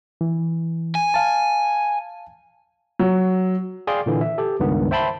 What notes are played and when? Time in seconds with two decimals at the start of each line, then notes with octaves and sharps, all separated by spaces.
0.21 E3
0.95 G#5
1.14 F5 A5
2.99 F#3
3.87 G#4 D5 F5 G5 C6
4.06 A#2 D3 E3
4.21 E5
4.38 G4 A4
4.60 C#2 G2 D#3 B3
4.91 C5 E5 G5 A5 B5 C6